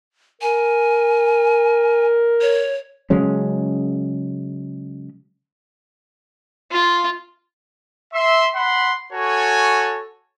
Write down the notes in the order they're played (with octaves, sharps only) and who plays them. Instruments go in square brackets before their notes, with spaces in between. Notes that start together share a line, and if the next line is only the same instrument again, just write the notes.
[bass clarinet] A#4 [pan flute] G#5
[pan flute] C#5
[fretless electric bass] C#3 F#3 G#3 C#4
[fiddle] F4
[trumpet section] E5 C6
F#5 B5 C6
F#4 A4 C#5 G#5